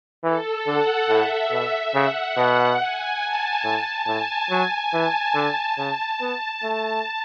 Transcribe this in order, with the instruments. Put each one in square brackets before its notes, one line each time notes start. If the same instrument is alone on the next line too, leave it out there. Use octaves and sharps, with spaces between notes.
[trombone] E3 [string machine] A4
[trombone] D3 [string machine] F#5
[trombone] A2 [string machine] E5
[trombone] B2
[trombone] C#3 [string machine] F#5
[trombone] B2
[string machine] G#5
A5
[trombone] A2 [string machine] A5
[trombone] A2 [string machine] G#5
[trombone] F#3
[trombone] E3 [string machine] A5
[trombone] D3
[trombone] C#3 [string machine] A5
[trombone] B3 [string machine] A5
[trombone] A3